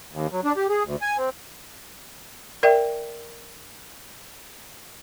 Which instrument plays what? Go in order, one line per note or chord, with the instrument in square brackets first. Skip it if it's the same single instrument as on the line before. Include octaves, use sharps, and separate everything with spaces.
[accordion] D#2
F#3
D4
G4
G#4
D2
G#5
C4
[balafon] A#4 D5 E5 G5